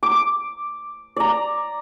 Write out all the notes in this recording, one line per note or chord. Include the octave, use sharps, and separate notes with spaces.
D6
D5 A#5